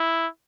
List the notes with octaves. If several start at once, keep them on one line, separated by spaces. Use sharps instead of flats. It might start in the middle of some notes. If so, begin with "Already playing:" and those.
Already playing: E4